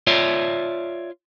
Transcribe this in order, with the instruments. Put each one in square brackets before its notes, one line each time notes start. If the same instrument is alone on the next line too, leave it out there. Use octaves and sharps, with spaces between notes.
[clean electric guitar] F4 C#5 D5 E5